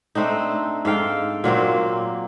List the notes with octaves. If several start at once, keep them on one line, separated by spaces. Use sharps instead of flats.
A3 C4 D4 D#4
G#2 A4 F5 G5
A#2 F#3 A#3 C4